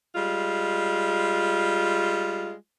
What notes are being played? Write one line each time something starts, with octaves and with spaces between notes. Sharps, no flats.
G3 G#3 F4